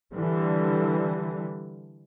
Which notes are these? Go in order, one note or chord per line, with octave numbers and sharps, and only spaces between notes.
D3 E3 G3